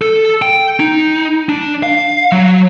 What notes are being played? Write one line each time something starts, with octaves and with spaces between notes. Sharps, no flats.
A4
G5
D#4
D4
F5
F#3